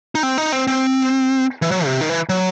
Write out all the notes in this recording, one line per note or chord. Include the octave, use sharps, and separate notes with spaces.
D#4
C4
D#4
C4
C4
E3
F#3
C3
D#3
E3
F#3